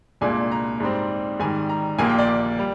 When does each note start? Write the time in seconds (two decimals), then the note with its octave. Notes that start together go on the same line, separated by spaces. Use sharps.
0.21 C2 A#2 G#3 D4 F4 G#5
0.52 A#5
0.80 G#2 G3 C4
1.40 G#2 D#3 G3 G#5
1.69 A#5
1.98 A#1 A#2 G3 A#3 G#5
2.09 G5
2.18 D5
2.59 G3